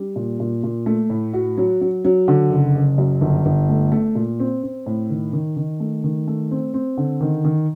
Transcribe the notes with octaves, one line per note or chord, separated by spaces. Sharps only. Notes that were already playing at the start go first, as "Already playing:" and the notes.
Already playing: G3
A#2
A#2
A#2
A3
A2
F#4
F#3
F#3
F#3
D3
F#1
F#1
F#2
G1
G1
A3
A3
A#2
C4
C4
A2
D#3
D#3
D#3
A3
D#3
A3
C4
C4
D3
D#3
D#3